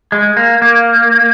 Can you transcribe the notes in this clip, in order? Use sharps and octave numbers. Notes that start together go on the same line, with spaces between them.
G#3
A#3
A#3